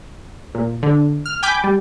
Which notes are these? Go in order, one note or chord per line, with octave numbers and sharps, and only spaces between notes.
A#2
D3
F6
G5 G#5 B5 D6 G6
G3